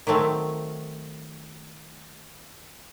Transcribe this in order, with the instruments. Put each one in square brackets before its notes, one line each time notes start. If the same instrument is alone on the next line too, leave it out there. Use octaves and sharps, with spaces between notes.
[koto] D#3 F#3 A3 C4